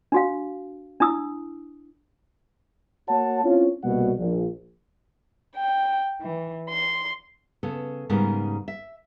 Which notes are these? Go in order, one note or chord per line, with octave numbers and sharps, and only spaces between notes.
D4 F#4 F5
D4 E4 D#6 E6
A#3 F#4 C#5 F#5 A5
C4 C#4 E4 F4 C#5
C2 B2 G3 A#3 F#4 F#5
A#1
G5
E3
C6
C#3 B3 A4
G#2 C#3 G3 B3 G#4 A#4
E5